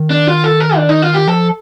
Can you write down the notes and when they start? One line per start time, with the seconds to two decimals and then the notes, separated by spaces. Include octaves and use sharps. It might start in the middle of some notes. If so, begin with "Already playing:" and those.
Already playing: D#3
0.10 D4
0.27 F4
0.44 A4
0.60 A#4
0.77 D4
0.89 D#4
1.02 F4
1.15 G4
1.27 F3 A4